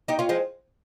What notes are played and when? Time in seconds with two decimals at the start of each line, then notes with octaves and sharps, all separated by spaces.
0.08 D#4 G4
0.19 C#4 F4
0.29 F3 G#3